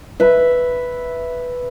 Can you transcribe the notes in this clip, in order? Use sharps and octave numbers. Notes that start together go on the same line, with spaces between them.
B4 E5